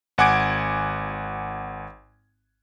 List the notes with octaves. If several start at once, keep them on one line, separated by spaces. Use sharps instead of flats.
G#1 F#5 G#5 D6 G#6 D7